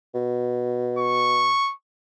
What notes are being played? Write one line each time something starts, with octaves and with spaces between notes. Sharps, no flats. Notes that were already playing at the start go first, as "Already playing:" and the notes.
B2
C#6